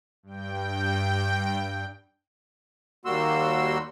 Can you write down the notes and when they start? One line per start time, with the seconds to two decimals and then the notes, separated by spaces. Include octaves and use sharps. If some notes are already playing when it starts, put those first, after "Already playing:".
0.23 G2 G5
3.05 D#2 G3 A#3 F#4 C6 E6